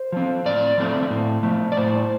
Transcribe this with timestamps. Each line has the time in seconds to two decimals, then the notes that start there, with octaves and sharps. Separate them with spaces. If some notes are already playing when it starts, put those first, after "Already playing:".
Already playing: C5
0.12 F3 C4
0.46 A2 D5
0.78 F3 A3 C4
1.11 A2
1.43 F3 A3
1.72 D5
1.77 A2 C5